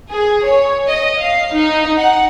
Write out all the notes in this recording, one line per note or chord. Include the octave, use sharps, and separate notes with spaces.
G#4
C#5
D#5
F5
D#4
F#5